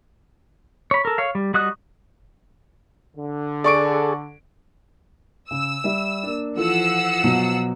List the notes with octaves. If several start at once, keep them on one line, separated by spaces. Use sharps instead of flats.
C#5 B5
A4 A#4
C#5 F5
G3
G3 F#4 D#5 D#6 F#6
D3
G#4 A4 D5 C#6 D7
C#3 E6
G3 E5
A#3 D4
E3 F3 F4 A4 F#5 E6
B2 F#3